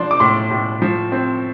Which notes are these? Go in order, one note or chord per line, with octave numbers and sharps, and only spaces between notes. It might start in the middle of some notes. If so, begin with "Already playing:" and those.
Already playing: F3 D4 C6
D6
A2 C6
A2
F3
C4